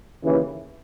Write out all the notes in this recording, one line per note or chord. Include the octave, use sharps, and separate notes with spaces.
D#2 C#3 E3